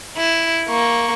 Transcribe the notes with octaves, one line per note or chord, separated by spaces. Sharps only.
E4
A#3 C#6